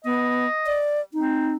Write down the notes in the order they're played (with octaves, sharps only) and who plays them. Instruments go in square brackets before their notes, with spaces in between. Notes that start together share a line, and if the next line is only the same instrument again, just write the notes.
[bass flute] B3 [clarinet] D#5
[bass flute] D5
[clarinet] C4 [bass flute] D#4